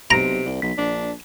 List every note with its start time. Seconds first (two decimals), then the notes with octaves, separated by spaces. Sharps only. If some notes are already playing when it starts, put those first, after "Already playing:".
0.11 B1 C3 A#5 D7
0.45 C2
0.62 B1 B6
0.78 A#1 D4